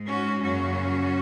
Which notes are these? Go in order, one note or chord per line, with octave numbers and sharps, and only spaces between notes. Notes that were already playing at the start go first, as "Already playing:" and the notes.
Already playing: G#2 G#3
C#4 F#4
F#2 C#3 F#3 A#3 C#4 F#4